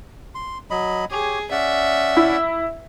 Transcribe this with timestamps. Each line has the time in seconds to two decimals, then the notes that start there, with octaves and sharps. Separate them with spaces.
0.35 C6
0.71 F#3 D#5 B5
1.11 G4 G#4 C#5
1.51 C#4 D5 E5 F#5
2.17 E4